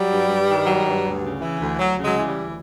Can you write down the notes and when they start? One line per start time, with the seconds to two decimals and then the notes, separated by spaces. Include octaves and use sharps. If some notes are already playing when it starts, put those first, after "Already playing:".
Already playing: F#3 G3
0.11 G2
0.29 G2
0.48 D#3
0.66 F#3
0.85 G2
1.04 D2
1.23 C#3
1.41 E3
1.60 D2
1.78 D2 F#3
1.98 C#3
2.04 F#3 G#3
2.16 E3
2.28 G3
2.35 D2